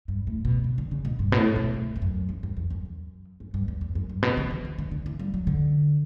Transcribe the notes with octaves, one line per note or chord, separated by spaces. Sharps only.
G2
A2
B2
C#3
D3
C#3
B2
G2
B2
A2
B2
A2
E2
F#2
E2
G2
E2
F#2
F#2
F#2
G2
E2
E2
F#2
G2
B2
D3
E3
E3
D3
D3
E3
G3
F#3
D3